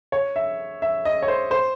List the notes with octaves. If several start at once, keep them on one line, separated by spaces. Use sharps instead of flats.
C#5
E5
E5
D#5
C#5
C5
C5